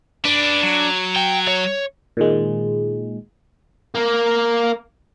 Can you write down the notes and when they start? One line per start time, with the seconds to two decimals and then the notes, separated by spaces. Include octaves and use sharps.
0.25 D4 B4 D5
0.63 F#3
1.16 G5
1.48 C#5
2.17 A#2 D#3 G#3
3.95 A#3 A#4